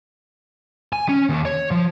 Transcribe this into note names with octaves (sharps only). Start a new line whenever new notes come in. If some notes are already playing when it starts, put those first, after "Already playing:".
G#5
C#4
D#2
C#5
F3